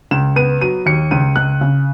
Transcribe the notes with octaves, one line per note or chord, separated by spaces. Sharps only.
C#2 E7
B3 D#7
F#3 D#7
D#2 C#7
C#2 D#7
C#2 F#6
C#3